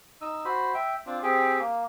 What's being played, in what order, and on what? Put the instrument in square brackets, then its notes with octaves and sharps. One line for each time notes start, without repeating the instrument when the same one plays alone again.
[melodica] D#4 E6
F#4 C5 B5
E5 G5
C4 D4 F4
C4 G4 G#4
A#3